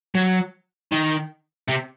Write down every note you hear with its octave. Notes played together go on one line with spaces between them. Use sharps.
F#3
D#3
C3